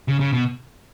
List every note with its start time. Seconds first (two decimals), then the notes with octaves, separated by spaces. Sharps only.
0.08 C#3
0.20 C#3
0.33 B2